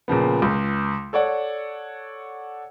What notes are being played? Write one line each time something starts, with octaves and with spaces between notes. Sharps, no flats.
A#2 C#3 F3 B3
C#2
A4 C#5 D5 F#5